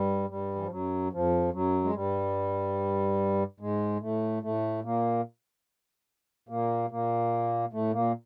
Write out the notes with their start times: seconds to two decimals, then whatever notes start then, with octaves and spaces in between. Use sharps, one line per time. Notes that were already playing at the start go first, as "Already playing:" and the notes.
Already playing: G2 G3
0.29 G2 G3
0.55 E3
0.62 F3
0.71 F#2 F#3
1.13 F2 F3
1.53 F#2 F#3
1.84 G#3
1.95 G2 G3
3.60 G#2 G#3
4.01 A2 A3
4.43 A2 A3
4.84 A#2 A#3
6.49 A#2 A#3
6.91 A#2 A#3
7.73 A2 A3
7.94 A#2 A#3